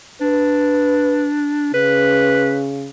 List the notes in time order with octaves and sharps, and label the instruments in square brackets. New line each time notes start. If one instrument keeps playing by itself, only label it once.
[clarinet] D4 [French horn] B4
[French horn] C#3 [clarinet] B4